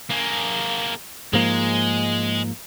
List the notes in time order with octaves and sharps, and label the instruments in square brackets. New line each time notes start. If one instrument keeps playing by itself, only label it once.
[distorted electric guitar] A#3 G#4
[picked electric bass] G#2 F3 A#3 [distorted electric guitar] G#3